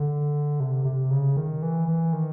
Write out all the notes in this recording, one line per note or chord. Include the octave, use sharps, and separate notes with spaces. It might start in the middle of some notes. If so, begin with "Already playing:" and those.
Already playing: D3
C3
C3
C#3
D#3
E3
E3
D#3